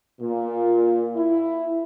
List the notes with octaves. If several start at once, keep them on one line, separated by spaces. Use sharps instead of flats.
A#2
E4